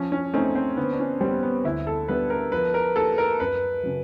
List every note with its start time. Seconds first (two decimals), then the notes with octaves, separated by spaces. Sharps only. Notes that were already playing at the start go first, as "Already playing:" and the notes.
Already playing: F3 C#4
0.12 C#4
0.33 A3 C4 C#4 D#4
0.55 C4
0.77 D3 B3
0.92 D4
1.00 C#4
1.20 G3 B3 C4
1.43 B3
1.65 D2 E4
1.87 A4
2.08 D3 G3 B3 B4
2.30 A#4
2.52 F3 B4
2.74 A#4
2.96 A#3 D#4 G4 A4
3.18 A#4
3.40 F#2 B4
3.83 C#3 F#3